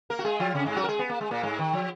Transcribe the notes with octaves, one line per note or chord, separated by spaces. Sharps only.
A#3 A#4
F#4
G#3 G#4
F3 F4
C#3 C#4
G#2 G#3
F#3 F#4
A#4
G#3 G#4
B3
A#3
G#3
A#2 A#3
G#2 G#3
D#3
F3